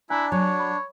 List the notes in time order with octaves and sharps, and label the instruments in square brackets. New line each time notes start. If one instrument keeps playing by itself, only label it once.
[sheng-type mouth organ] D4 [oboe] E4 [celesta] G#5 A#5 F#6
[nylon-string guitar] F#3 [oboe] C#5
[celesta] B5 C#6